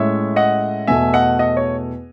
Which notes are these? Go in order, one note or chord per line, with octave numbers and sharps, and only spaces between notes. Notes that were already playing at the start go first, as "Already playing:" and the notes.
Already playing: A2 G#3 C#4 E4 C#5 E5
D#5 F#5
E2 B2 A3 E5 G#5
D#5 F#5
D#5
C#5